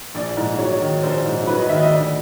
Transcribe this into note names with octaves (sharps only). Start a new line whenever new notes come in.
A#1 D5
G#2
F#3 C#5
D#3
A#1 C5
G#2
F#3 B4
D#5
D#3 E5
D#5
D2 D5